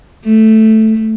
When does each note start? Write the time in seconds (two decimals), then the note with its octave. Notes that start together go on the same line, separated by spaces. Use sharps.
0.24 A3